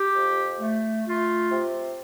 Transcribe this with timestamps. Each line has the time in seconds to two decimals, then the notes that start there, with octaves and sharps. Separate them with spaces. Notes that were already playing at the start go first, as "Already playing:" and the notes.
Already playing: G4
0.14 F2
0.60 A3
1.06 A3 F4
1.51 C3